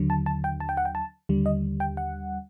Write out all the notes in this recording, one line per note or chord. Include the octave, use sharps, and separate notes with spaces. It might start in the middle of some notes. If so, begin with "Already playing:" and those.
Already playing: D#2 D3 F#3
A5
A5
G5
A5
G5
F#5
G5
A5
D#2 D3 G3
D#5
G5
F#5